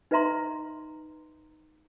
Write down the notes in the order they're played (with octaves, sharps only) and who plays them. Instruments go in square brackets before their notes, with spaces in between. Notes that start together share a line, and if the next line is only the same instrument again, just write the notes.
[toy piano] D#4 B4 D#5 E5 A#5 C6